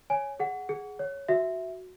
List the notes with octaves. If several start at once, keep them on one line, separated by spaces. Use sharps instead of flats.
C#5 G#5
G#4 F#5
G#4
C#5
F#4 E5